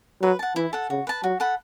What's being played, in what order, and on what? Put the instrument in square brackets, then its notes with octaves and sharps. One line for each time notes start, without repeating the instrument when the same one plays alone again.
[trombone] F#3 [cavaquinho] B4
[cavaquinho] F#5 A5
[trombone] E3 [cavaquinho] E4
[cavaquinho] A4 F#5
[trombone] C#3 [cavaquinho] F#4
[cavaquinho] B4 A5
[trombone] F#3 [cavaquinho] F#4
[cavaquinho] A4 F#5 B5